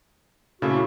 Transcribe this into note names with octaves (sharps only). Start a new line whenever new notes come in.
A#2 C#3 A3 E4 F#4